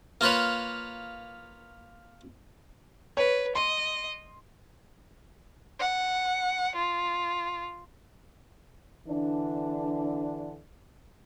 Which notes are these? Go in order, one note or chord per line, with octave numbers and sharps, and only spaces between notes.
A#3 F4 B4 C#5
B4 C#5
D#5 C6
F#5
F4
D3 E3 D4